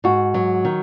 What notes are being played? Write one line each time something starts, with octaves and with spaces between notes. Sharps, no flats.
G#2 F#4
F#3
D#3